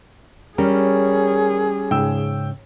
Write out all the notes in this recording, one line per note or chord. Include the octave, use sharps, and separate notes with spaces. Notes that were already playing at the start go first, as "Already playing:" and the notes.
G3 C#4 G#4 A#4
G#2 C#3 G5 E6